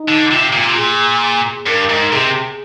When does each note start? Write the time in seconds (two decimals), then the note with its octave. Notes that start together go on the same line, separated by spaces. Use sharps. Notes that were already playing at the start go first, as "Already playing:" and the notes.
Already playing: D#4
0.09 D3
0.31 C3 F4
0.53 A#2
0.63 C3
0.72 A#2 G#4
1.67 G2 A#4
1.90 G#2
2.12 C3 G#4